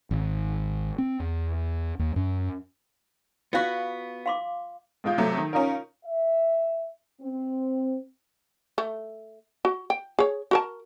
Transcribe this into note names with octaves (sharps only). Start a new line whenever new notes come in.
G#1
C4
E2
D#2
F#2
B3 F4 F#4 D5 F5
F5 C6 D6
A1 B2 G#3 F4 G6
C3 F#3 A3
D#3
C#4 D#4 F4 A#4
E5
C4
A3
F#4
G5
G#4 C#5
F#4 A#4 A5